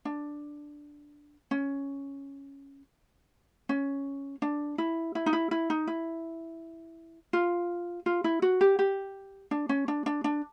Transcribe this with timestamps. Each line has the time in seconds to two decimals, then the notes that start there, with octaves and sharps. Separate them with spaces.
0.05 D4
1.51 C#4
3.69 C#4
4.42 D4
4.78 E4
5.15 E4
5.26 D#4
5.33 E4
5.51 E4
5.70 D#4
5.87 E4
7.33 F4
8.06 F4
8.24 E4
8.42 F#4
8.61 G4
8.79 G4
9.51 D4
9.69 C#4
9.88 D4
10.06 D4
10.24 D4